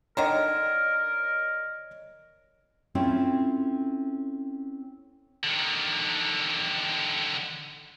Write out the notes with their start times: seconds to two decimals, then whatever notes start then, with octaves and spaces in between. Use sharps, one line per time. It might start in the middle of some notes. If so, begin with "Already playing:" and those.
0.17 D3 D#3 A#4 C#5 D#5 A#5
2.95 C4 C#4 E4 F4 A4
5.44 D3 D#3